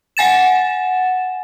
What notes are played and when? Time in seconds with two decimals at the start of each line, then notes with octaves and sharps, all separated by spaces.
0.17 F#5 G#5 A6 E7